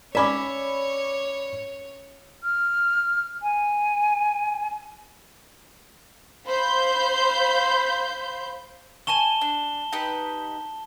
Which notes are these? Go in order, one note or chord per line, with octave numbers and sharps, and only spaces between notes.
C#4 C#5 D5 E5 B5 D6
F6
G#5
C5 F5 B5 C6 G6
G#5 A5 C#6 E7 G7
D4
D#4 G4 B4